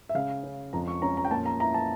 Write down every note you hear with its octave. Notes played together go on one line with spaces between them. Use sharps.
E5
C#3 F5
C#4
F2 A#5
C#6
C#4 A#5
A#5
G5
A#2 A5
A#5
E4 A#5
A5